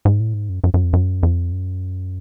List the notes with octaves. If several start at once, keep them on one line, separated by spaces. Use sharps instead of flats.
G#2
A2
G#2
F#2
F#2
F#2
F2
F#2
F2
F#2